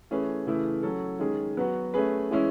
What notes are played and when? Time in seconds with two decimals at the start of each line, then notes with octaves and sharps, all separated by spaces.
0.11 E3 A3 C#4 G#4 B4
0.47 C#3 E3 A3 E4
0.83 F#3 C#4 F#4 A4
1.20 D#3 G#3 C#4 G#4
1.57 F#3 B3 F#4 B4
1.94 A3 C#4 G#4 B4
2.30 E3 G#3 C#4 E4